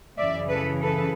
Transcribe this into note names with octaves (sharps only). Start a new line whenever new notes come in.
F#2 C#3 E3 D5 E5
A4 B4
A4 B4